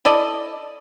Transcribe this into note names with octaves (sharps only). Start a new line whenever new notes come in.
E4 A4 D5 D#5